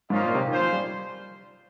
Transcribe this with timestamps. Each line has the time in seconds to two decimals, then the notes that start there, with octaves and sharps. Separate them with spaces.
0.10 G#2 A#3 C#4 F4 C5 D#5
0.23 A#2
0.35 C3
0.48 D#3 C#4 F4 C5
0.60 F3
0.73 G3